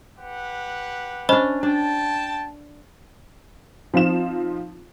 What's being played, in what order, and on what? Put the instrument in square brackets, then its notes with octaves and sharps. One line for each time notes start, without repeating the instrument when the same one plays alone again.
[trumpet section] G4 B4 F#5
[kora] C#4 D4 [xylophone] C5 D#5 B5
[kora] D4 [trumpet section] G5 A5
[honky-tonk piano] F3 C4 D#4 F4 E7